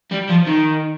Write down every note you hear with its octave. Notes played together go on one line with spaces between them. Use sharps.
G3
F3
D#3